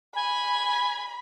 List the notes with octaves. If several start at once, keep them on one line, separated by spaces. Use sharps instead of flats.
G#5 B5